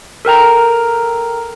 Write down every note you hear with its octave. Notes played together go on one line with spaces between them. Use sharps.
A4 A#4 G5 A#5